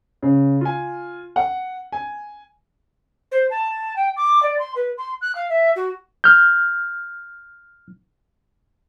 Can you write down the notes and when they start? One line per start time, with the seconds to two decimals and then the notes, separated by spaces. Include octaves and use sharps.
0.23 C#3
0.61 F4 G#5
1.36 F#5
1.92 G#5
3.31 C5
3.50 A5
3.96 G5
4.17 D6
4.42 D5
4.59 C6
4.76 B4
4.98 C6
5.21 F#6
5.35 F5
5.49 E5
5.76 F#4
6.24 F6 G6